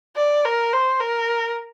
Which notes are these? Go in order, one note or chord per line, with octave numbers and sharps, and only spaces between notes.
D5
A#4
C5
A#4